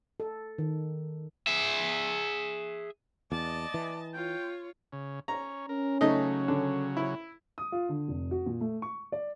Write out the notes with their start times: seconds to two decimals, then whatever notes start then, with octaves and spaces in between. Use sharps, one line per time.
0.20 A4
0.58 D#3
1.47 G#4 E5
3.32 E2 D5 D#5 A5
3.74 E3
4.14 F4 C#5 G5
4.93 C#3
5.28 C#4 A#5
5.69 C#4 A#4
6.01 C#3 F#3 A3 D#4 D#5
6.48 D3
6.97 E4
7.58 D#6
7.72 F4
7.89 D3
8.08 F1
8.31 F#4
8.46 A#2
8.61 A3
8.82 C#6
9.12 D5